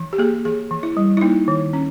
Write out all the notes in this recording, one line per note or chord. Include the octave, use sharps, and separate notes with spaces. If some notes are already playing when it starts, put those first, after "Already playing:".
Already playing: E3
G4
A#3 G#4
E3 G#4
E3
E4
G3
E4
A#3 D#4
D#3
C#4